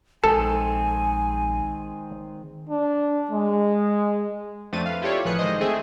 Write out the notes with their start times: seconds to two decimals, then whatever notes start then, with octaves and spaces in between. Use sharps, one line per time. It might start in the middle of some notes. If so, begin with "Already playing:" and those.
0.24 A#1 D#3 G#3 C4 A4 G#5
2.69 D4
3.31 G#3
4.73 F2 A3 C4 D4 A6 D#7
4.86 B4 F5
5.02 E4 F4 G4 A4 C#5 D5
5.25 A1 F3 G#4 B4 F#6 C#7
5.39 D#3 G#3 C5 D#5
5.61 A3 C4 G#4 E5